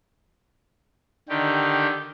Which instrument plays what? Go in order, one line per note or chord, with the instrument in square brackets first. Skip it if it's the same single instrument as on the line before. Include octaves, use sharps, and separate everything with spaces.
[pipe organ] D3 D#3 G4